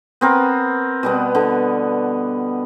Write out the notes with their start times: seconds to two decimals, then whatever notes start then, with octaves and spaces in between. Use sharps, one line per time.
0.21 B3 C4 A#4
1.03 B2 G3 B3
1.35 D3